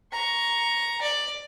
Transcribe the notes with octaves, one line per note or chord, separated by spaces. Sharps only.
A#5 C#6
D5